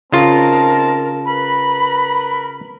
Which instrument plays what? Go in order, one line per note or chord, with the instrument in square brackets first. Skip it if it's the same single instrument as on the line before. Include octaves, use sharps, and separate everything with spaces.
[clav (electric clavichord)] C#3 F4 [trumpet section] C4 D#4 A5 [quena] A#4
[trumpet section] A#4 B4 [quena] B5